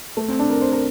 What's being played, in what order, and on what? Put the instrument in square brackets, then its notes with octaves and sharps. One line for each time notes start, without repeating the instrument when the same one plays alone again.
[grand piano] A3
C4
D4
A#4
C5
A#4